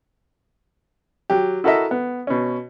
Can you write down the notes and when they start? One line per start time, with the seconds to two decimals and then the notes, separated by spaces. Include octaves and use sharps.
1.30 F#3 G4
1.64 E4 F#4 A4 A#4 D#5 E5
1.91 B3
2.27 B2 C#4